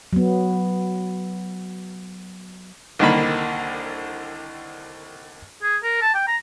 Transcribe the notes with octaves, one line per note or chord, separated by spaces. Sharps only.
F#3 B3
C2 D3 D#3 A#3 B5
G#4
A#4
A5
G5
A#5